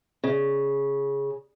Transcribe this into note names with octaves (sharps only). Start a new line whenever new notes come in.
C#3